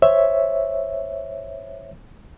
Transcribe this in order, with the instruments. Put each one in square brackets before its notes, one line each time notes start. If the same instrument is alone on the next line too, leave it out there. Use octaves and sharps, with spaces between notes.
[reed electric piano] C5 C#5 E5